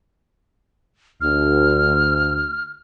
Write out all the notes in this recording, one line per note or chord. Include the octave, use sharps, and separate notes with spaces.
D2 F6